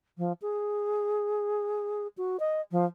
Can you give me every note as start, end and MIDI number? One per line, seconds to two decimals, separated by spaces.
0.18 0.33 53
0.42 2.07 68
2.17 2.39 66
2.40 2.61 75
2.71 2.85 53